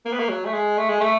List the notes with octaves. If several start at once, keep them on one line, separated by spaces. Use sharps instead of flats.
A#3
B3
A#3
F#3
A3
G#3
A3
G#3
A3